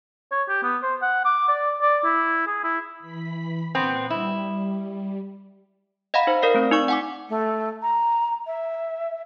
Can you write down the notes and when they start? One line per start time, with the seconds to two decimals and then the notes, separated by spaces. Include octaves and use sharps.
0.32 C#5
0.49 G4
0.63 B3
0.83 C5
1.02 F#5
1.25 D6
1.49 D5
1.82 D5
2.05 E4
2.47 G#4
2.64 E4
3.00 E3 B5 B6
3.75 A#2 B3 C4 F#5
4.10 G3 E4
6.14 D#5 F5 F#5 A#5 B5
6.27 D#4 C5
6.42 A#4 D5 F5 C7
6.54 A3 C4
6.71 D#4 D5 C#6
6.88 F#5 G#5 D6
7.30 A3
7.82 A#5
8.47 E5